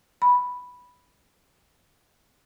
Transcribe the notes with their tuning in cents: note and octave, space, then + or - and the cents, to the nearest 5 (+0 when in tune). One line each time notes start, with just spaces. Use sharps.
B5 +0